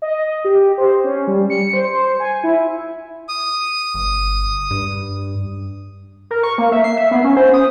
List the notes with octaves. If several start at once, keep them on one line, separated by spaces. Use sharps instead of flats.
D#5
G4
C5
C#4
G3
C#7
C5
C5
G#5
E4
D#6
G1
G2
A#4
C#6
A#3
E5
C7
E5
B3
C#4
C5
D#6